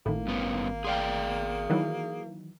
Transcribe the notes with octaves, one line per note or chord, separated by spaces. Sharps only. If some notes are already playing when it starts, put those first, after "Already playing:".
G#1 A2 D#3 A#3
G2 B3 C#4
G#4 D5 F5 G5 C6
D#3 E3 F#3